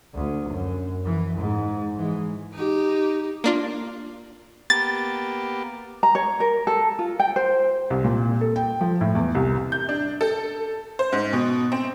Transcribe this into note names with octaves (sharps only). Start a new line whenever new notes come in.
D2
F#2
E3
G#2
E3 G#3
D#4 G4
A#3 D4 F4
A#3 B3 G4 A6
A#5
C#5
A#4
A4
F4
G5
C5
C2
A#2
A4
G5
F3
A2
E2
C2
G6
D4
A4
C5
G#2
B2
C4